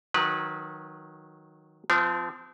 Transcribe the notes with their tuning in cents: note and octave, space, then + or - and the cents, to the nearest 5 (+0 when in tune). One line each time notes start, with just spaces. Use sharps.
D#3 +0 F#3 -15 B4 -20
F3 -5 C4 -40